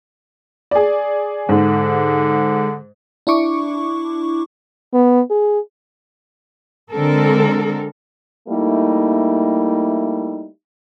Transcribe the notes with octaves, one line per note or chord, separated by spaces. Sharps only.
G#4 D5
G#2 D3
D4 E4 C#6 D6
B3
G#4
D3 G#3 C4 A4 A#4
G3 A3 A#3 D#4 E4